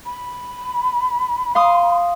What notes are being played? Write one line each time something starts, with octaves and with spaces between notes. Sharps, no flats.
B5
F5 C6 D#6